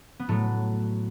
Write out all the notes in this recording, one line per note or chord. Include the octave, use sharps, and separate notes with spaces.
B3
A2 F#3 A3